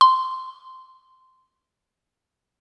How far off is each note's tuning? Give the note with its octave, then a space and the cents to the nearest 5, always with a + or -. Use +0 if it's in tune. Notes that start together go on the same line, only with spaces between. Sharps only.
C6 -10